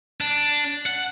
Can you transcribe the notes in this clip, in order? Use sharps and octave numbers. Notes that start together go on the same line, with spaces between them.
D4
F#5